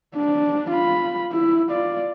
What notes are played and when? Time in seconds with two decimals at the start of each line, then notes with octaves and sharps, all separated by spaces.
0.15 D4
0.71 F4 B5
1.32 E4
1.70 F4 D5